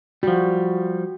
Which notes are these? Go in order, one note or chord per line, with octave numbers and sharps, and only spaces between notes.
F3 G3 F#4